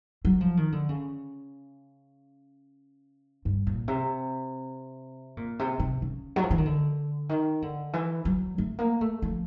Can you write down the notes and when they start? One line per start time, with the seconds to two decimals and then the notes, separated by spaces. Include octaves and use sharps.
0.25 F#3
0.41 F3
0.57 D#3
0.72 D3
0.89 C#3
3.45 G2
3.67 A#2
3.88 C3
5.37 A#2
5.59 C3
5.80 C3
6.02 C#3
6.36 F#3
6.43 F3
6.51 E3
6.58 D#3
6.66 D3
7.29 D#3
7.62 D3
7.93 E3
8.25 F#3
8.58 A3
8.79 A#3
9.01 A3
9.22 F3